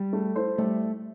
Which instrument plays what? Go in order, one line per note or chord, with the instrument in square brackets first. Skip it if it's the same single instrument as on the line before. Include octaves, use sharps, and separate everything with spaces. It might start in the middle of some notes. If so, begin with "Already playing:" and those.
Already playing: [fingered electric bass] G3
[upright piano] A3
E4 A4 C5
[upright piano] G3 [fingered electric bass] A3